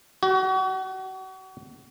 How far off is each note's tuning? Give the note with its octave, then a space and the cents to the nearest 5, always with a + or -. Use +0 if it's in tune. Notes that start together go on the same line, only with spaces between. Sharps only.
F#4 +35